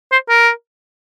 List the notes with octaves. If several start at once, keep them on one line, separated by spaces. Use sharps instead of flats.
C5
A#4